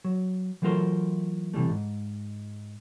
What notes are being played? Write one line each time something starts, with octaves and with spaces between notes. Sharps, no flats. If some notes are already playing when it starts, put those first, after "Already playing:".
F#3
E3 F#3 A3 F4 A#4 C5
C3 E3 G3 A3
G#2